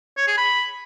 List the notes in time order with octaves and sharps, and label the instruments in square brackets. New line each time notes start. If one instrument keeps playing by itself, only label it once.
[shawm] C#5
G#4
B5